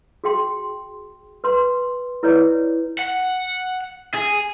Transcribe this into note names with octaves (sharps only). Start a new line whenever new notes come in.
F#4 G#4 G5 C6
B4 C6
E4 B4 C#5 D5
F#5
G#4